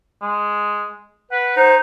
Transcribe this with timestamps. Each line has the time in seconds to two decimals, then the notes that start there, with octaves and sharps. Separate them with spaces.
0.22 G#3
1.31 B4 F#5
1.57 D#4 C5